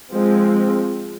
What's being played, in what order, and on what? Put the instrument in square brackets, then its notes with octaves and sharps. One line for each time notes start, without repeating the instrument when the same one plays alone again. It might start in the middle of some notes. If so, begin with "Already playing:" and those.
[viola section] F3 G#3 C4